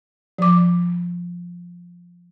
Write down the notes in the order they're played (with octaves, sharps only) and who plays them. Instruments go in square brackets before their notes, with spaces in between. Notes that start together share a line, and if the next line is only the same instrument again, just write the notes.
[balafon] F3 D6